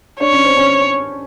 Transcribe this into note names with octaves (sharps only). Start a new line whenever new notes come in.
D4 C#5
C#4
C4
C#4